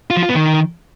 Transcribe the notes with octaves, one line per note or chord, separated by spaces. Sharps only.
F4
F3
F4
B3
D#3